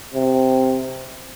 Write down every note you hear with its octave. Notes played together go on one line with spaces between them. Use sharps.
C3